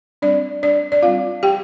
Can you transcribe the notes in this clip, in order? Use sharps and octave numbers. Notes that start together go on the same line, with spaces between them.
G3 C4 D4 D5
D4 D5
D5
G3 C4 F4 F5
G4 G5